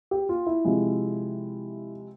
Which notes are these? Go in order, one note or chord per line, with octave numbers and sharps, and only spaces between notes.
G4
F4
E4
C3 F3 G#3